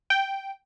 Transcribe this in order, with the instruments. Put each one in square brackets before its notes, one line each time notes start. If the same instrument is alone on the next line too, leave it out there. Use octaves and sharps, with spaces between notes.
[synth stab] G5